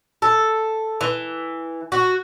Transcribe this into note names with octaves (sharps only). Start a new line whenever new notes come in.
A4
E3
F#4